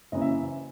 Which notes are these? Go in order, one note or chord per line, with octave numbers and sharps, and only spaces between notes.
F#1 F#2 C#3 E3 D#5
E5